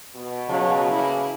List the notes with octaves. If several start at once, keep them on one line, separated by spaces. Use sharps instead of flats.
B2
C#3 F#3 F5 A5
E3 A#3 E4